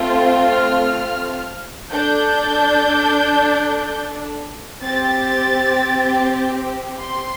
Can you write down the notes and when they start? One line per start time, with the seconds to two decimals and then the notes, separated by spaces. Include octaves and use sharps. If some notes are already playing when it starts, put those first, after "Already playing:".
Already playing: A3 C4 F4
0.47 F6
1.92 D4 A4 G6
4.82 C4 G4 A6
7.00 C6